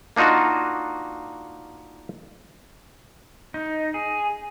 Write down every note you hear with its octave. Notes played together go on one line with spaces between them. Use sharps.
A#3 D4 D#4 F4 F#4
D#4
G#4